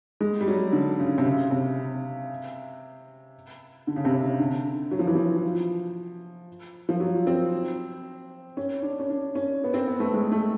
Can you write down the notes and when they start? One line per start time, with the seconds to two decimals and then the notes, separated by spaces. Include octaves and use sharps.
0.21 G#3
0.41 G3
0.48 F#3
0.73 D3
0.99 C#3
1.18 C3
1.25 C#3
1.51 C3
3.87 D3
3.96 C#3
4.05 C3
4.15 C#3
4.39 D3
4.91 F#3
4.99 F3
5.07 E3
5.15 F3
6.89 F3
7.00 F#3
7.27 C4
8.57 C#4
8.82 D4
8.99 C#4
9.10 D4
9.35 C#4
9.64 B3
9.74 C4
9.87 B3
10.00 A3
10.14 G#3
10.32 A3